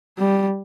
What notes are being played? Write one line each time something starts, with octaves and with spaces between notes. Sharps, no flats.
G3